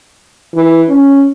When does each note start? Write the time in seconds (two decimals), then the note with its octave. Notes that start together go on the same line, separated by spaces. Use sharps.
0.54 E3
0.89 C#4